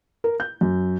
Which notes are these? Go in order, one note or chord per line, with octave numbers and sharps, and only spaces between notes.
A#4
G6
F#2